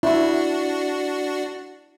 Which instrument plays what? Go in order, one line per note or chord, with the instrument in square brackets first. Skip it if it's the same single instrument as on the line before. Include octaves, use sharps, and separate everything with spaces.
[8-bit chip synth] D4 F#4 [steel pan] E4